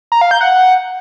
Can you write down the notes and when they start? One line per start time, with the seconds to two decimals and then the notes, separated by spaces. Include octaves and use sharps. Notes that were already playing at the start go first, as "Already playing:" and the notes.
0.12 A#5
0.21 F5
0.31 G6
0.41 F#5